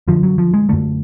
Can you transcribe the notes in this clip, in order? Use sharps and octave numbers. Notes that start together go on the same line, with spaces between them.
F#2 D3 F3
F#3
F3
G#3
F#2 D3 A3